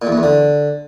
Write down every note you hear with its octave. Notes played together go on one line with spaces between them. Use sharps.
A#2
E2
G2
E2
D3